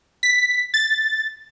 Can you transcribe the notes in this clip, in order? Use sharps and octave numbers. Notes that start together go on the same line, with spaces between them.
B6
A6